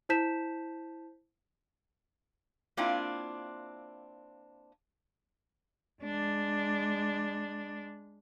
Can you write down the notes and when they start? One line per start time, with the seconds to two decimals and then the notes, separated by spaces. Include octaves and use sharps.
0.09 E4 C5 A5 G6 B6 E7
2.77 A#3 C4 D4 E4 F4 G5
6.03 G#3 D4